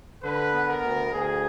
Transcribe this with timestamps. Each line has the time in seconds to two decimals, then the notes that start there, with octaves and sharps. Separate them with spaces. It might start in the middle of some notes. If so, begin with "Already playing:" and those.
0.23 D3 B4
0.53 B3
0.68 A#4
0.83 D2
1.13 D2 G#4